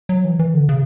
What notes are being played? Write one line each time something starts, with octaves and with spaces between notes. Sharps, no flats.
F#3
E3
E3
D3
C#3